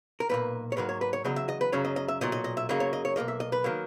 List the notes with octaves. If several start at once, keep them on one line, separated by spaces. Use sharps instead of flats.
A#4
B1 A#2 A#3 B4
C#5
G#2 F#3 A#3 B4
C#5
B4
C#5
E2 C#3 F#3 D#5
E5
D#5
B4
F#2 C#3 F#3 C#5
D#5
D#5
E5
B1 A#2 F#3 D#5
D#5
D#5
E5
F#2 C#3 F#3 A#3 D#5
C#5
D#5
C#5
B1 A#2 A#3 D#5
E5
D#5
B4
D#3 F#3 A#3